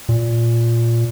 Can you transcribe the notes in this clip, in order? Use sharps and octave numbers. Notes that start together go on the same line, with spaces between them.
A#2